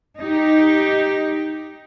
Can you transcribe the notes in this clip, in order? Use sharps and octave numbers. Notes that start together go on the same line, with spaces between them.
D#4 G4